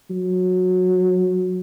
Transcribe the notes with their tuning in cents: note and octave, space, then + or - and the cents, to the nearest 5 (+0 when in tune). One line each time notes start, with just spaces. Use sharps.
F#3 -15